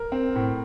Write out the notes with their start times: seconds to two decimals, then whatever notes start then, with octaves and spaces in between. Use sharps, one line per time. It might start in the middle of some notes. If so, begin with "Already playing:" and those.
Already playing: A#4
0.12 C4
0.35 A2